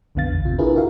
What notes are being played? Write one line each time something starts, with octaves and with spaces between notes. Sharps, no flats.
B1 F2 D3 B3 F5 A6
A#1 E2
G1 C3 F4
D4 E4 F4 G#4 A#4 B4
F#4 A#4 E5 F5